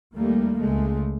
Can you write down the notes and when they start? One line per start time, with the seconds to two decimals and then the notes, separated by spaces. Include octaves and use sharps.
0.14 D#2 G3 A3 A#3
0.58 C#2 G#3 A3